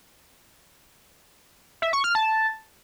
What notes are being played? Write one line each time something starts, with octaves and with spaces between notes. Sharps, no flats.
E5
C#6
F6
A5